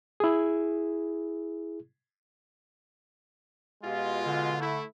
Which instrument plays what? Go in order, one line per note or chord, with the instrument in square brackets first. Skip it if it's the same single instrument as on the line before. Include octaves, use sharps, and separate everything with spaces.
[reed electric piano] E4 G#4
[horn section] B2 G#3 F4 [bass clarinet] G4
[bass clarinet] D3
[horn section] A3 E4